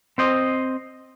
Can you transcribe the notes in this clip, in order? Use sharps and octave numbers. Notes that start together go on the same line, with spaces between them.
C4 C5 D#5